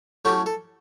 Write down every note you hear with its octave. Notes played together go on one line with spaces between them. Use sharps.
A2 F#3 A3 C#4 G4
A4